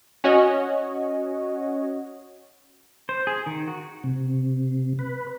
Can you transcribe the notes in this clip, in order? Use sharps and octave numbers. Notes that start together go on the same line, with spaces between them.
C#4 F#4 C#5 D#5
C5
G#4
D#3
F#4
C3
B4